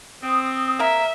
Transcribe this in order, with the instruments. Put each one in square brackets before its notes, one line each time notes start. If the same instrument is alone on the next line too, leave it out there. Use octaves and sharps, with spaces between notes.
[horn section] C4 [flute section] D#6
[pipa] A#3 A#4 [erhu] E5